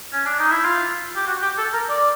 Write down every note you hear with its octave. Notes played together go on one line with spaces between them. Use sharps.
C#4
D4
D#4
E4
F4
G4
F#4
G4
A4
A#4
D5